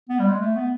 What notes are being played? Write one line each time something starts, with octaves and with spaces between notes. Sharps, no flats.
B3
G3
G#3
A3
B3